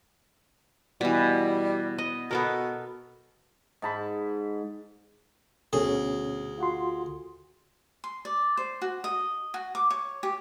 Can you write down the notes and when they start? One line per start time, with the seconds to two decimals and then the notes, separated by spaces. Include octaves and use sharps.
1.01 B2 E3 G3
1.98 D#5
2.31 B2 B3 A4 A#4
3.82 G#2 A5 B5
5.73 D2 B2 C#4 G#4
6.58 F4 F#4 C6
8.04 C6
8.25 D5
8.57 C5
8.82 F#4
9.04 D#5
9.54 F#4
9.75 D6
9.91 C#5
10.23 G4